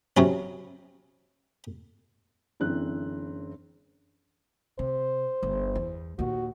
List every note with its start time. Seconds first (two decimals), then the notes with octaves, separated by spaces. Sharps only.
0.17 C3 F#3 C#4
2.60 F#1 D3 E3 C4 F#6
4.79 C3 C5
5.43 G1
5.75 E2
6.19 D#2 A#2 F#4